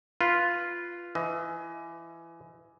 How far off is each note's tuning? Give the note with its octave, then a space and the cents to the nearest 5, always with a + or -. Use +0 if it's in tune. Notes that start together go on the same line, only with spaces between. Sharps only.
F4 -5 B4 +0
E3 +25 D#5 +25